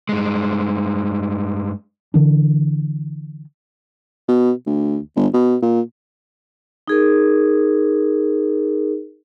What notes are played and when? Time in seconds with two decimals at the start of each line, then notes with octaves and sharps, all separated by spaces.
0.09 G2 G#3
2.14 D3 E3 D4
4.28 B2
4.67 D2
5.16 G1
5.34 B2
5.62 A#2
6.88 D#4 G#4 A#4